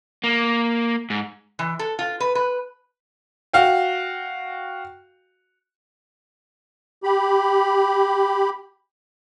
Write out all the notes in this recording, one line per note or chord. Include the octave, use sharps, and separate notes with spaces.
A#3
G#2
E3
A4
F4
B4
B4
F#4 F5 G5
G4 B5